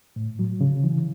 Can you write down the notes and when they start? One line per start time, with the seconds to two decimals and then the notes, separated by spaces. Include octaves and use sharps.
0.16 A2
0.39 F#3
0.61 C#3
0.84 E3